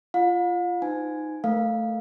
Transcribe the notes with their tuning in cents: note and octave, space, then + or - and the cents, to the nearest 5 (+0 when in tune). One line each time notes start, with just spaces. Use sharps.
F4 -15 F5 +45
D#4 +0 C5 -35 G#5 +0
A3 +0 A#4 +20 F5 +0